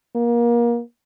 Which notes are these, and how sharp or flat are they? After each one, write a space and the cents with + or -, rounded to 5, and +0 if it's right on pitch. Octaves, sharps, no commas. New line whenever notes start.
A#3 +25